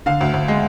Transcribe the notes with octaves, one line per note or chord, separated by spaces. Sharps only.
D3 F5
D2
D2
G#3